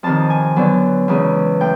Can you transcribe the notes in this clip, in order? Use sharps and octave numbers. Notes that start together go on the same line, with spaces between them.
F2 C3 D#3 A5
G#5
D3 F#3 B3
E2 C#3 E3 G#3 C#4
A2 G5